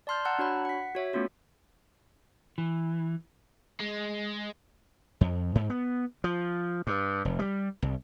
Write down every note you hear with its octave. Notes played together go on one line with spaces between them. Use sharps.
D5 A5 C6 F6 G6
F#5 A5 A#5 E6 F#6
D4 F#4 C#5 F#5 B5
F#5 B6
F#4 C#5 E5
A3 B3 C#4 F4 F#4
E3
G#3
F2
G#2
B3
F3
G2
F1
G3
C2